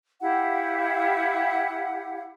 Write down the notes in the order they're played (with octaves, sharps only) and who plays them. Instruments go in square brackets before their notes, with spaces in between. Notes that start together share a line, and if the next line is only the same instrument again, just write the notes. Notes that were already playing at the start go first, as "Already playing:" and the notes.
[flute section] E4 G4 F5 F#5